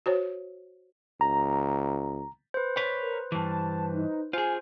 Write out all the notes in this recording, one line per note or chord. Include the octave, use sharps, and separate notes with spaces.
F#4 C5 C#5
C#2 A#5
B4 C5
C#5 B5
A#4
G2 E3 A5
D#4
F4 G#4 C5 G#5